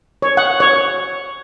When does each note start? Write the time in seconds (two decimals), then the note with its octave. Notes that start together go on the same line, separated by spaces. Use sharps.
0.22 C#5
0.37 F#5
0.60 C#5